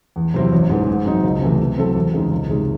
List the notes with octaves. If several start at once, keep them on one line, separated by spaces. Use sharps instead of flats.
E2
C3 F#3 C4 E4
A1
G#2 E3
G#2
F#3 C4 D#4
C#2
C3 E3 A3 C4
C3
F#3 C4 E4 A4
E2
C#3 G#3 C4 D#4
C#2
C3 D#3 G#3 C#4